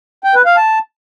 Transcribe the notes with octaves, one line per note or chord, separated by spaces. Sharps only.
G5
B4
F5
A5